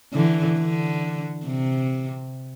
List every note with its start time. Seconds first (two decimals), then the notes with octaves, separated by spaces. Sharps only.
0.14 D3 E3
0.58 D3
1.46 C3